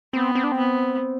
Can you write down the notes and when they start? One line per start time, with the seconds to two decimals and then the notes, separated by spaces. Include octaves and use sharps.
0.13 B3 C4
0.35 C4
0.44 D4
0.52 C4
0.57 B3